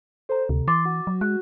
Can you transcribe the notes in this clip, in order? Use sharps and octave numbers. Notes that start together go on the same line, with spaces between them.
A4 C5 A#5
D2 C3
E3 C6 D6 A6
F#4
F#3
G#3 F#6